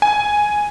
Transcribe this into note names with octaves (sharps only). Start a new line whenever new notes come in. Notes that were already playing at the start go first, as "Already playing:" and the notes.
G#5